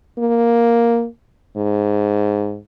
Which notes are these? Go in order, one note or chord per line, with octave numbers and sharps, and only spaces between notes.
A#3
G#2